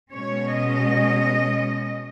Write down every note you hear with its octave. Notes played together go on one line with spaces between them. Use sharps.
B2 G#3 C#4 C#5
D#5